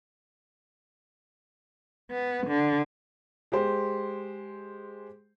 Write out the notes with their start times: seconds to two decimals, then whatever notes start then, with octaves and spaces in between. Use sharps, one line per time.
2.11 B3
2.47 D3
3.52 G#3 G4 C5